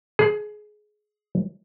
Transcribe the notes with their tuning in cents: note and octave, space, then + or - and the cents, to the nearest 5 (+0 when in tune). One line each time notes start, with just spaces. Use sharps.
G#4 +20